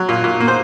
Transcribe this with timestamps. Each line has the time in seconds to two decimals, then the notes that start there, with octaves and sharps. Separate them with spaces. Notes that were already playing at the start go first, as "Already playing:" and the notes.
Already playing: F#3
0.09 A#2
0.24 A#2
0.40 A#3
0.48 C5